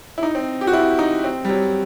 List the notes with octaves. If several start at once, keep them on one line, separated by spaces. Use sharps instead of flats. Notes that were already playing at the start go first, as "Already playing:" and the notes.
E4
D#4
C4
G4
F#4
E4
D#4
C4
G3
F#3